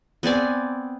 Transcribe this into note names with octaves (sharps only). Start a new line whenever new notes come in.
B3 C4 D5 G#5